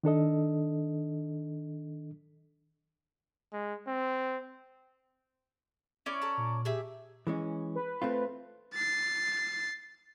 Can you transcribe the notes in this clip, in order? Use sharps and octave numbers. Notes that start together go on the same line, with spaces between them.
D#3 D4 A4 D#5
G#3
C4
C#4 E4 C#5 D5
A4 A5 A#5
A#2
G4 G#4 E5
E3 G#3 C#4
B4
A3 C4 F4
A6 C7